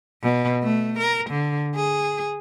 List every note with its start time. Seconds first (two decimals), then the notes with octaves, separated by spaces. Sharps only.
0.23 B2
0.63 A3
0.99 A#4
1.30 D3
1.76 G#4